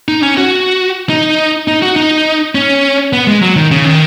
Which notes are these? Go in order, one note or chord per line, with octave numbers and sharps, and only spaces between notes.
D#4
C#4
F#4
D#4
D#4
F#4
D#4
C#4
B3
G#3
F#3
D#3
C#3
D#3